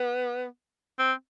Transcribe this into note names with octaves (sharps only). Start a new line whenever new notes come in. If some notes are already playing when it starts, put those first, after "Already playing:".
Already playing: B3
C4